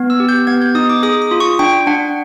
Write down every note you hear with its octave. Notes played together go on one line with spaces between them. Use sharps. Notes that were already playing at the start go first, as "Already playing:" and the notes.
Already playing: B3
E6
G4
G6
B3 G#6
G6
D#4 D#6
D6
G#4 D#6
D#6
F4
C#6
D4 G5
D4 F#5